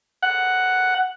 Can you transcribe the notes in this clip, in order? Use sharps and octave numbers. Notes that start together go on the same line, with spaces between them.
F#5